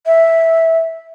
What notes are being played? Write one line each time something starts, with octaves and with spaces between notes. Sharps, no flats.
E5